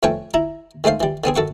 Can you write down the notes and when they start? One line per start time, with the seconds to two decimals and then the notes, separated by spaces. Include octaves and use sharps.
0.03 F2 A3 C#4 B4 C#5 G5
0.34 E4 A#5
0.84 D#3 G#3 A3 C5 F5
1.00 E3 G3
1.24 D3 B3 C4 G#4
1.36 F#2 A4 F#5 C#6